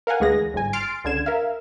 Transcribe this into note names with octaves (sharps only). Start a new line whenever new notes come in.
A#4 F5 F#5 G#5
D2 E3 G#3 G#4 A#6
G1 G#2 G#5
C6 F6 A6 C7 D7
C#2 D3 G#6 E7
A#4 E5 F5